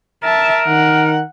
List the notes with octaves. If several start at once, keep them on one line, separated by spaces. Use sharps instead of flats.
A#4 E5 A5
D#3 F#5